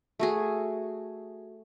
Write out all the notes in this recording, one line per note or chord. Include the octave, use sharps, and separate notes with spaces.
A3 F#4 G#4